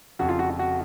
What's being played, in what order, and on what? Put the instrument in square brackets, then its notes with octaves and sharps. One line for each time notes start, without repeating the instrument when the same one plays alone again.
[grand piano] F1 F2 C#3 [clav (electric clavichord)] F#4
[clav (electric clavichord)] F4
F#4
F#4